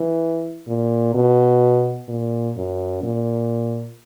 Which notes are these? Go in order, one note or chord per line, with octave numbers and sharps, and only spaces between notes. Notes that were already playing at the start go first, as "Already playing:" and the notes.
Already playing: E3
A#2
B2
A#2
F#2
A#2